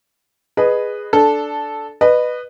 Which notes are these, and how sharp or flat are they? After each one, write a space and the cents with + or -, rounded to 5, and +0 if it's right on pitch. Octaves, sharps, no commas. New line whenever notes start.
G#4 +0 B4 +0 D#5 -20
D4 +0 A4 -10
B4 +0 D#5 -30